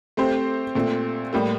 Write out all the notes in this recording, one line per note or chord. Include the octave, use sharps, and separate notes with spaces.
A3 C4 G4 C5
A#2 A3 C4
A2 G3 A#3